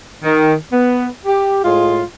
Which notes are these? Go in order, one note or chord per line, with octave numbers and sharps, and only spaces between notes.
D#3
B3
G4
A2 G#3 F4